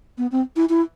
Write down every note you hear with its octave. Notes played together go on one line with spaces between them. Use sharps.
B3
C4
E4
E4